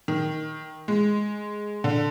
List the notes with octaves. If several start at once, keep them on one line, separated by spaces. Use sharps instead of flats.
D#3
G#3
D3